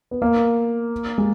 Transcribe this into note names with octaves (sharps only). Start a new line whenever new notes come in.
B3
A#3
G#3